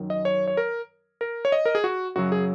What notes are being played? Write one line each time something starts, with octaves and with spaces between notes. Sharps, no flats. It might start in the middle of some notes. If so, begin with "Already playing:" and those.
Already playing: F#2 D#3 F#3
D#5
C#5
C#5
A#4
A#4
C#5
D#5
A#4
G#4
F#4
F#2 C#3 F#3 F#4
G#4